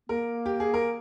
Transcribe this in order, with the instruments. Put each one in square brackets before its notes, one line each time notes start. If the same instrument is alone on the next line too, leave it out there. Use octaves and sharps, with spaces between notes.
[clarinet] A#3 [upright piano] A#4
[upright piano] G4
G#4
A#4